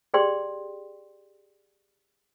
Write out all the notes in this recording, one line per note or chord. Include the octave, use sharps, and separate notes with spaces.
G4 G#4 D5 G5 C6